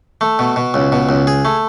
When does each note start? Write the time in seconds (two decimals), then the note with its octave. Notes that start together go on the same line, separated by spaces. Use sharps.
0.21 A3
0.39 B2
0.56 B2
0.74 C#2
0.92 B2
1.09 C#2
1.27 G#4
1.45 A3